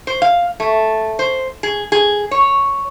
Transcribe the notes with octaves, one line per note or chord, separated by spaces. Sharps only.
C5
F5
A3
C5
G#4
G#4
C#5